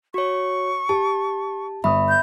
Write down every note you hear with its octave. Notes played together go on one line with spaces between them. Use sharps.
F#4 C#5 C#6
G4 A5
G1 E5 B5 C#6 D#6
G6